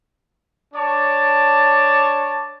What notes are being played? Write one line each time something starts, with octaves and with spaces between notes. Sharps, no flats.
D4 C#5 A5 D6